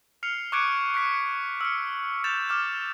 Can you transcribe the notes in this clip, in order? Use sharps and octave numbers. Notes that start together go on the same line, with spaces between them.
F6 C7 C#7 F7
C#6 D6 F#6 G#6 C#7 D7
C#6 F#6 B6 C#7
E6 F6 C#7
G6 A6 E7 F7
D6 F6 E7